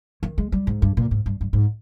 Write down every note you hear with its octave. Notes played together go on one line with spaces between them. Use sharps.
D#3
G#3
G3
G#2
G2
A#2
G#2
G2
G2
G#2